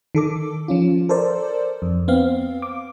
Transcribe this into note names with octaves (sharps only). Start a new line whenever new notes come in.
D#3 A4 D6
F3 C#4 F4
A4 A#4 C5 D5
F2
B3 C4 F5
D6